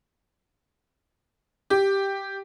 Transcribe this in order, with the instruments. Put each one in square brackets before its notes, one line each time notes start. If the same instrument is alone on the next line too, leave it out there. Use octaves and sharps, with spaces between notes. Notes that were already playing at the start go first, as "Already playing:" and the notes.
[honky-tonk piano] G4